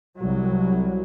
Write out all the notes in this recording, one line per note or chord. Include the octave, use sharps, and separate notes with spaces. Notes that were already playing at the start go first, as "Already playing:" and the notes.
C2 F#3